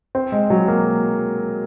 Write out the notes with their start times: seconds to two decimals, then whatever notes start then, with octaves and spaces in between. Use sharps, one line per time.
0.15 C4
0.32 G#3
0.50 F#3
0.68 A#3